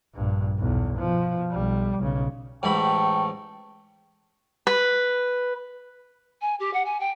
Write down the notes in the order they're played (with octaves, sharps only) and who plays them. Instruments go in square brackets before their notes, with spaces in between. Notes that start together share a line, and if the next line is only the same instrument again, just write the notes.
[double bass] A#1 G2
B1 E2
B2 F3
B1 G3
B1 C#3
[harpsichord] A1 G#2 B5 [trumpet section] G5 A5 C#6
[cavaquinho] B4
[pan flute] G#5
G4
F#5
G#5
G5